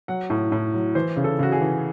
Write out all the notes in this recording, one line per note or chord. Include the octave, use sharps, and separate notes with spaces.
F#3 F#5
A2
A2
F#3
E3 C5
C#3
A4
C#3 F#4
G#4
E3